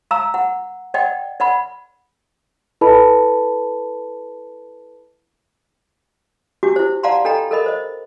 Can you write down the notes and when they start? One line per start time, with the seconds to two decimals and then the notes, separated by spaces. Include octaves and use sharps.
0.11 F5 A#5 E6
0.34 F#5
0.94 D5 D#5 F#5 G5
1.40 D5 F#5 B5
2.81 E4 A4 B4 D#5 A5 B5
6.63 C#4 D4 E4 F#4 G4 D6
6.76 E4 C5
7.03 D5 F5 F#5 A5 A#5 C6
7.25 D4 A4 D#5 G5 A#5 B5
7.51 A4 A#4 D#5 B5
7.66 C5 D#5